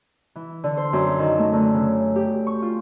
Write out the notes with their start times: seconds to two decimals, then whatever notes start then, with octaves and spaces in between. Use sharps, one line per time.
0.36 E3
0.64 D3
0.77 C5
0.93 F#2
1.19 D#3
1.39 A3
1.53 D3
1.74 C#3
2.16 G4
2.47 C#6
2.62 F4